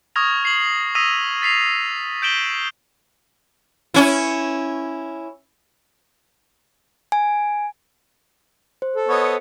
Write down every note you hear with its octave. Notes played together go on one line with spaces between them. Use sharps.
C#6 D#6 F6 G#6 A#6 F7
C7 F#7
D#6 E6 A#6 B6 D#7 F7
A6 B6 C7 F7
G6 B6 D7 E7 F#7 G7
C#4 E4
G#5
C5
A4
B3 C#5 D#5